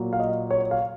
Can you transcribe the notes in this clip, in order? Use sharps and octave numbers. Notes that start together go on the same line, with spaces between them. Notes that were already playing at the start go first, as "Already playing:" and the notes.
Already playing: A#2 F#3
F5
D#5
C#5
F5